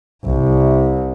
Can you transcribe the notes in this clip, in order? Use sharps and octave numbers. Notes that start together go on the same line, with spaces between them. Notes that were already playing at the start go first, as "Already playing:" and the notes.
C2